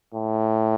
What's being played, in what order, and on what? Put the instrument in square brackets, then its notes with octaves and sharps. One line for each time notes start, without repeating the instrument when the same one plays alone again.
[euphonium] A2